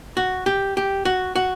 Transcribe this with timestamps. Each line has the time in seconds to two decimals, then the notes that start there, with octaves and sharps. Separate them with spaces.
0.17 F#4
0.46 G4
0.77 G4
1.05 F#4
1.36 F#4